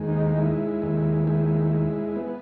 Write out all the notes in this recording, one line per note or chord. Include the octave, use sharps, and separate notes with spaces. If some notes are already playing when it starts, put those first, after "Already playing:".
Already playing: D#2 G#3
D#4
G#3 E4
D#2
G#3 E4
G#3
B3